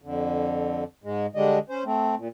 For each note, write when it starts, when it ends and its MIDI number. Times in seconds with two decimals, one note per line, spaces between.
0.02 0.84 41
0.02 0.84 50
1.04 1.26 44
1.04 1.26 56
1.35 1.59 50
1.35 1.59 55
1.35 1.59 56
1.35 1.59 62
1.35 1.59 75
1.69 1.83 61
1.69 1.83 72
1.85 2.15 57
1.85 2.15 60
2.17 2.28 46